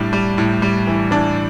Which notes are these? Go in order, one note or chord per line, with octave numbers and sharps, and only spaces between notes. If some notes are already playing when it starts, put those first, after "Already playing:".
Already playing: A2 G3 D4
G3
A2
G3
E3
E3 D4